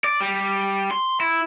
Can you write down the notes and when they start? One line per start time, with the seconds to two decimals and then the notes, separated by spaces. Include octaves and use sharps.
0.04 D5
0.21 G3
0.91 C6
1.20 E4